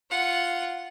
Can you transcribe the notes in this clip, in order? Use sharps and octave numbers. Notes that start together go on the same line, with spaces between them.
F4 F#5